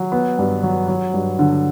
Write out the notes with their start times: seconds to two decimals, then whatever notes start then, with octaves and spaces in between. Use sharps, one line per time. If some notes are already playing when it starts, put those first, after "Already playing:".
Already playing: F#3
0.12 B3
0.38 G2
0.63 F#3
0.88 F#3
1.14 G2
1.39 D3